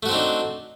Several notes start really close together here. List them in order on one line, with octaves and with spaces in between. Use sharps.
A3 F#4 C4 D#4 D4